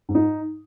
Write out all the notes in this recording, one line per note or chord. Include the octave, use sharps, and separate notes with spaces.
G#2
D#4